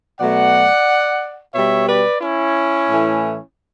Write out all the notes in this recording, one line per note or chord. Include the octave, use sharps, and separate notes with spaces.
B2 F#3 A3 D5 F#5
B2 G3 C#5 E5
B4 D5
C#4 E4
A2 E3 A3